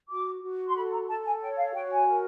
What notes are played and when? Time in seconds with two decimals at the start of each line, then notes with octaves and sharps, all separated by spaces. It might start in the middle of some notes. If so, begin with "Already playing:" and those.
0.09 F#4 D6
0.42 F#4
0.67 C6
0.75 A4 B5
0.91 A#5
1.08 A4 A5
1.25 G#5
1.41 C#5 G5
1.58 F5
1.74 F#4 G5
1.91 G#5
2.08 A#4